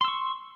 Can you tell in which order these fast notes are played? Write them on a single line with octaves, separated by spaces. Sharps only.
C6 E6 C#6